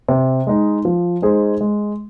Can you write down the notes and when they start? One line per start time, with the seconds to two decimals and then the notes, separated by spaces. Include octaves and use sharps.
0.09 C3
0.47 G#3 D#4
0.85 F3
1.22 G#3 D#4 G#4 C5
1.61 G#3